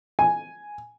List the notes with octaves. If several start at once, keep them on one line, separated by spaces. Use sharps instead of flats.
G#5